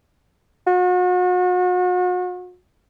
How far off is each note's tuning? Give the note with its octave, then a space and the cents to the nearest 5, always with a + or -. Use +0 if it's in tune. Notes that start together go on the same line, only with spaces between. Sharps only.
F#4 -40